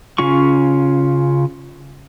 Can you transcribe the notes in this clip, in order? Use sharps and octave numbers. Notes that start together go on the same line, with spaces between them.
C#3 C#4 F4 C#6